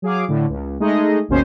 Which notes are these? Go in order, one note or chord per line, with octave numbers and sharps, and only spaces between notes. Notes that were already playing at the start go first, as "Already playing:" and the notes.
F#3 G#4 F5 D6
A2 D3
C#2
G#3 A3 D#4 G#4 D#5
G#1 D#2 B2 C#4 C5